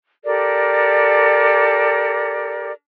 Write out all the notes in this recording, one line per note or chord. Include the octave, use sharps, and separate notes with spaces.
G4 A4 A#4 D5